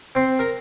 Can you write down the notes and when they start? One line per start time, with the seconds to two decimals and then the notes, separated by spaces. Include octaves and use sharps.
0.15 C4 C5
0.39 A#4